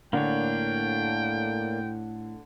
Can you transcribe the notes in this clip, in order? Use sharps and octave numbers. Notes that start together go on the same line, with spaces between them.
A2 D3 A#3 D4 C#5 G5